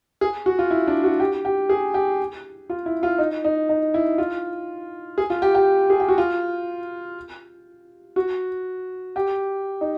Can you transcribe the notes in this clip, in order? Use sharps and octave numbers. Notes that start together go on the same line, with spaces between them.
G#4
F#4
F4
E4
D4
F#4
G4
G4
G#4
G4
F4
E4
F4
D#4
D#4
D#4
E4
F4
G#4
F4
G4
G4
G#4
G4
F#4
F4
F#4
G4
D#4